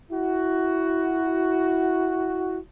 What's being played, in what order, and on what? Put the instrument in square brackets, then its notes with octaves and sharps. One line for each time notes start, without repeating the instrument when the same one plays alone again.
[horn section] E4 F#4